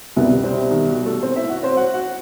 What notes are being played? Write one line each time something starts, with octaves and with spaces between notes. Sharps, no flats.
C2 B2 G3 B3
C3 C4
D#3 D#4
F#3 F#4
A3 A4
C4 C5
E4 E5
F#4 F#5
C4 C5
F#4 F#5
F#4 F#5